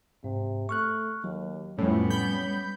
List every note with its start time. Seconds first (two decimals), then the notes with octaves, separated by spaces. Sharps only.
0.24 G#2 C3
0.69 A3 C#6 F6 F#6
1.24 D#2 F#3
1.78 F2 A2 G3 B3 C#4
2.10 B5 G6